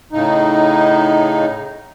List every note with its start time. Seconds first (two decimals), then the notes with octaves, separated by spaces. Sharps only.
0.12 A2 C#3 D#4